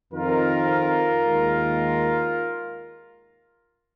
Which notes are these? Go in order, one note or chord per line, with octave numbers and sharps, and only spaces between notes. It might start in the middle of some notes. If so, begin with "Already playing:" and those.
F2 D#3 C4 D#4 F4 A#4
D#2 D#3 G#3